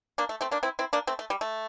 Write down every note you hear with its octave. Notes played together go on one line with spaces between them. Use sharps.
A#3 D4
A3
A3 C4
A#3 D4
C4 E4
C4 E4
A#3 D4
A3 C4
A3
G3
A3